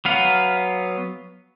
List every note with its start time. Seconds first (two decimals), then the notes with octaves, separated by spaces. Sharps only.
0.05 F#3 B3 F5